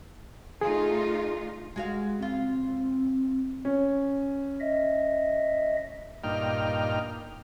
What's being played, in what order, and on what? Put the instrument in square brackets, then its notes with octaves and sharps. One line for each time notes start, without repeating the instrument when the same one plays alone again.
[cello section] A3 D#4 F4 [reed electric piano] G#4
[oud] G#3 F#4 F5
[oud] C#3 F4 [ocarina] C4
[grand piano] C#4
[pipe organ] D#5 E5
[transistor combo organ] G2 A#2 D#4 G5 F6